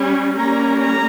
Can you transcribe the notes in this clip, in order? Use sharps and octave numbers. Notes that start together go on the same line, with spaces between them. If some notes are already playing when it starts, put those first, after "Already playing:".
Already playing: G3 C#4
G3 A#3 C#4 A#5
A#5